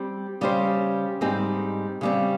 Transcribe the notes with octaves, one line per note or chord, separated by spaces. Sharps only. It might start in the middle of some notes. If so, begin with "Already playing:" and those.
Already playing: G3 C4
C#3 G3 C#4 G4 C5
G#2 G3 C4 D#4 G#4
C#3 G3 C4